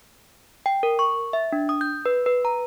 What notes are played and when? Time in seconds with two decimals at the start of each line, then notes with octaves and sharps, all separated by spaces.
0.66 G5
0.83 A#4
0.99 C#6
1.33 E5
1.52 D4
1.69 D#6
1.81 G6
2.06 B4
2.26 B4
2.45 A#5